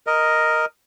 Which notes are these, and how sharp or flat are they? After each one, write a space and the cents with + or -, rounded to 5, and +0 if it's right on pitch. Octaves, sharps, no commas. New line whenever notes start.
A#4 +0 D#5 +0